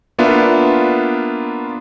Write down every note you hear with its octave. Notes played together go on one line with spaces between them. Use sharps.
A#3 B3 D4 F4 E5